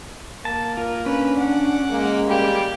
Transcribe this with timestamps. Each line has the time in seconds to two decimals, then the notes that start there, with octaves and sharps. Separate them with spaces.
0.45 A#3 A5
0.77 F4 A#4
1.06 C#4 D4 B4
1.38 D4 F#5 D6
1.91 G#3 A#3
2.26 G3 A#3 G4